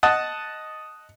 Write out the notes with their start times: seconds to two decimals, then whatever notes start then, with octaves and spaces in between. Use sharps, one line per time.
0.03 D#5 F#5 A5